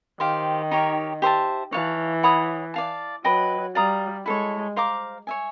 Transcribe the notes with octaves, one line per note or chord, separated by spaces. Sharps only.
D#3 G4 C5 F5
D#4 G4 A#4 C#5
G4 C5 E5 A5
E3 C#5 F5 A5
C#5 F#5 B5 D#6
D5 F5 A5
F#3 B4 D#5 G5
G3 D5 F5 A#5 D#6
G#3 E4 A4 C#5
C5 F5 A#5 D6
C#5 E5 G#5